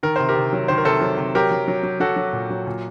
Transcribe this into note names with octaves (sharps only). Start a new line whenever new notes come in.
D#3 A#4
C3 C5
G4 A#4
C3
F#3
D#3 C5
A#4
C3 A4 C5
F#3
C3
F#3 G4 A#4
F#3
F#3
F#3
F#3 F#4 A4
F#3
A#2
F#3
A#2